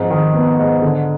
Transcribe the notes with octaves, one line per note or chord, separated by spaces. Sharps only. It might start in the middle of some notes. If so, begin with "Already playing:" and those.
Already playing: F2 G#2
D#3
B3
G#2
D3